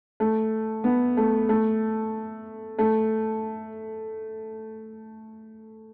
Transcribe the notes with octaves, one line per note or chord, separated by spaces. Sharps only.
A3
B3
A3
A3
A3